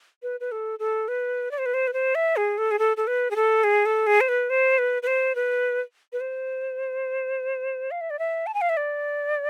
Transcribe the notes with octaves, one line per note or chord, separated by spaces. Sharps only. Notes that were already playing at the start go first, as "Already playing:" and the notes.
B4
B4
A4
A4
B4
D5
C5
B4
C5
B4
C5
E5
G#4
A4
G#4
A4
A4
B4
G#4
A4
G#4
A4
G#4
C5
B4
C5
B4
B4
C5
B4
B4
C5
F5
E5
D5
E5
A5
G#5
F5
E5
D5